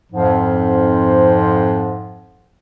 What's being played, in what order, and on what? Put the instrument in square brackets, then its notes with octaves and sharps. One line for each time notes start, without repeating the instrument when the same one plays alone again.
[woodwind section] F2 G#2 F3